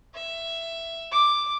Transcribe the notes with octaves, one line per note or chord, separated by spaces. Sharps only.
E5
D6